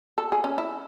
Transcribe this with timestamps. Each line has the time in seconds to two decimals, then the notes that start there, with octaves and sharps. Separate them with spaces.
0.18 A4
0.32 G#4
0.44 C#4
0.58 E4